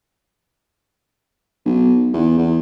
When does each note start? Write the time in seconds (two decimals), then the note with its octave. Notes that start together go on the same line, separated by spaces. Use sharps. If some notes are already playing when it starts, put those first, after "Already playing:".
1.65 B1
2.13 E2
2.38 E2